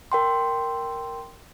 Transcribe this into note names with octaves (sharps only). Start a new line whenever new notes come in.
A#4 G5 C6